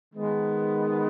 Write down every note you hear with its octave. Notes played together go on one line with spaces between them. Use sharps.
D#3 G#3 B3